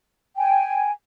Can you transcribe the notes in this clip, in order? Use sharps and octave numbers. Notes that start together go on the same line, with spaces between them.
G5 G#5